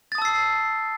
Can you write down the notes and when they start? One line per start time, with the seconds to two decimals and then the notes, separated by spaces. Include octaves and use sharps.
0.12 A6
0.15 D#6
0.18 A5
0.22 E6
0.25 C7